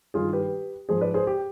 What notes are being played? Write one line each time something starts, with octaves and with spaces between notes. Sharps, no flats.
G2 D#3 G#3 F4 G#4
G4 B4
G#2 F3 G#3 G#4 C5
B4 D5
G#4 C5
G4